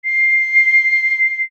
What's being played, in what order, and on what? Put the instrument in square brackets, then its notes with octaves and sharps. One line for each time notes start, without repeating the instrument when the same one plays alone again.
[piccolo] C7